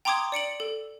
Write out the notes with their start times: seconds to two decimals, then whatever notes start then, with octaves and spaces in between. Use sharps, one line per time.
0.05 G5 A#5 C6 D6 D#6 G#6
0.32 D5 C#7 D7 F#7
0.60 A4